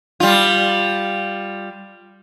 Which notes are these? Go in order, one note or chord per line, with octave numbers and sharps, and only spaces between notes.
G3 F4